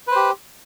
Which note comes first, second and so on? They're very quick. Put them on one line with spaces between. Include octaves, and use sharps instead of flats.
B4 C5 G4